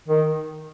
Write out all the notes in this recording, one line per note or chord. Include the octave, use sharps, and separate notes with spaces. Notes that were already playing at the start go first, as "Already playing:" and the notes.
D#3